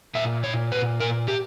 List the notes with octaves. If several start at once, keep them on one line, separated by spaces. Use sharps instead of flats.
A#2 E5
C#5
B4
A#4
G4